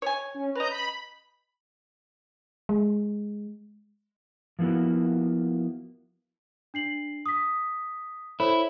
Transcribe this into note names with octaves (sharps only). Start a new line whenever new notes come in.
C#5 G#5
C#4
B4 D#5 A#5 G6
B5
G#3
F3 A#3 B3 E4 F#4
D4 C7 F#7
D#6 B6
E4 A4 C5 C#5